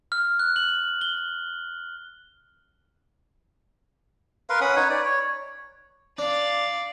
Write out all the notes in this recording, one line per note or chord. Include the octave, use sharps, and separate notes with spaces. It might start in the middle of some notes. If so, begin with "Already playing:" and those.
F6
F#6
F#7
G7
A#4 B4 F5 C6
C#4 F#5 B5 D#6
D#4 B4 C#5
D5
C#5
D4 D5 F5